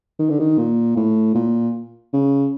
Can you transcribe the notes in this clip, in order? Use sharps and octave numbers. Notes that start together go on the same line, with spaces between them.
D#3
D3
D#3
A#2
A2
A#2
C#3